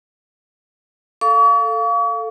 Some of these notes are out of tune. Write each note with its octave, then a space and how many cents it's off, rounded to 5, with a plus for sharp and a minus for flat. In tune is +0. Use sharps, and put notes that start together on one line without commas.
A4 +10 F5 +0 C#6 +45